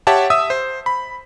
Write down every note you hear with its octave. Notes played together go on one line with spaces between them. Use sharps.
G4 C#5 E5 F#5 A5
E5 D#6 E6
C5
B5